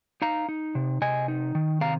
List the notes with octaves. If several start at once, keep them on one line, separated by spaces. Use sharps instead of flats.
D#4 F5 A#5
D#4
C3
C3 D#5 G#5
D#4
D#3
C3 F5 A#5